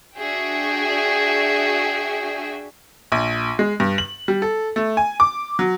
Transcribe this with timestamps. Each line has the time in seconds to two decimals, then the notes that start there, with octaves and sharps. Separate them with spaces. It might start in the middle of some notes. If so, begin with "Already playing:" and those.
0.15 D4 F#4 G#4 E5 G5
3.12 A#1
3.59 G#3
3.80 G2
3.98 F#7
4.28 G3
4.42 A4
4.76 A3
4.97 G#5
5.20 D6
5.59 F#3